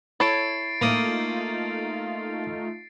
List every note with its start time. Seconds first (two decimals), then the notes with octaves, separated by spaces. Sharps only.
0.20 E4 A4 C#5 A6 C7 D7
0.81 A3 A#3 D#4 F4 D#6